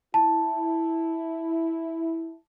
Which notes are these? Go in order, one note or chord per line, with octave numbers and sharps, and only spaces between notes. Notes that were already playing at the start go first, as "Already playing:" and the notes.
E4 A5